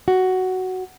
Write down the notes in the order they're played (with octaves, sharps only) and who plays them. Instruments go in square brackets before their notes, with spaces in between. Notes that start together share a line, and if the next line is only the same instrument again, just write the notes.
[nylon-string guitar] F#4